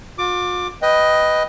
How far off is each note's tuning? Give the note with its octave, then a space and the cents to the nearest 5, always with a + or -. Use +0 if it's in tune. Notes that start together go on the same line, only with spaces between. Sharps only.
F4 +45 D6 +10
B4 +0 D#5 +5 G5 +0